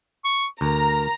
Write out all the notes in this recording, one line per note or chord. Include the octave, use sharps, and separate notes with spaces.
C#6
D2 A#4 A#5